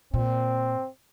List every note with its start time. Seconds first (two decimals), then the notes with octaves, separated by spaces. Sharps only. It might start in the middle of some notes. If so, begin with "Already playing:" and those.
0.14 A#2 C4